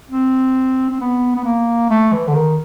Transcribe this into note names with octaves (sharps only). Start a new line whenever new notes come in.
C4
C4
B3
B3
A#3
A3
E3
D3
D#3